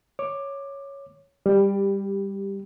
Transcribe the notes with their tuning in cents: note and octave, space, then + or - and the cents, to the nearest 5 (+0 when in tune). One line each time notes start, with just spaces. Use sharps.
C#5 +0 D6 +15
G3 +15 G4 +0